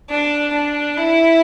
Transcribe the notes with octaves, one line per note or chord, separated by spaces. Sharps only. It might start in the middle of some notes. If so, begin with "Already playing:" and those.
D4
D4
E4